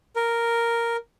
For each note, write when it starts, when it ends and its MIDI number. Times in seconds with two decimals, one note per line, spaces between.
0.16 0.97 70